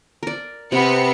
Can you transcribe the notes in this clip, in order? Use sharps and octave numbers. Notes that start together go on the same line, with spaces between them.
A#4 D5
C3 B3 C4 C#7